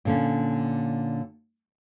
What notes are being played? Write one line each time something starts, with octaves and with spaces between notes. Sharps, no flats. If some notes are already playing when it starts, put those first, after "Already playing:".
A#2 D3 C#4